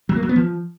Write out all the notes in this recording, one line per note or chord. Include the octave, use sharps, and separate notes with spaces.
F#3
A#3
F#3
B3
F3